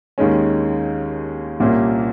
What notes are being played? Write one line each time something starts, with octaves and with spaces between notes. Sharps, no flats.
D#2 D#3 G#3 C#4
C2 A#2 G3 A#3 C#4